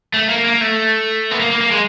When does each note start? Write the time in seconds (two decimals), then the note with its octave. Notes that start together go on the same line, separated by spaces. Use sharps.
0.14 A3
0.29 A#3
0.44 A#3
0.61 A3
1.31 B3
1.40 A#3
1.50 A#3
1.61 A#3
1.71 G#3